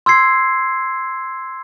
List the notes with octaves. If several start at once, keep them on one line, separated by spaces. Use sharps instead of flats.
C6 E6 G#6 C7